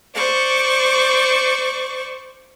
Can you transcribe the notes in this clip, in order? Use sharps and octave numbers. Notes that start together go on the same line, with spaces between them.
C5 D5 C#6